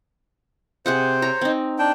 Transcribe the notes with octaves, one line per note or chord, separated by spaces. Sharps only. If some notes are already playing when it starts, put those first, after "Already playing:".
C3 G#4 C5 F#5
C#5 A#5
C4 D#4
D4 G5